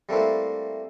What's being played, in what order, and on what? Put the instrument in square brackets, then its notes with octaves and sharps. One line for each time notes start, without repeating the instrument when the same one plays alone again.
[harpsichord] G3 A3 A#3 C4 D4 E4